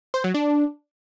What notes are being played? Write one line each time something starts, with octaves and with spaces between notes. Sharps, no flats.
C5
F#3
D4